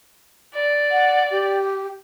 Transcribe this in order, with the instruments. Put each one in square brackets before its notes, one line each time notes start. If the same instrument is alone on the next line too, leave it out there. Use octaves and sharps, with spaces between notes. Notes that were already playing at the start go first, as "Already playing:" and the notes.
[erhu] D5
[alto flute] F#5
G4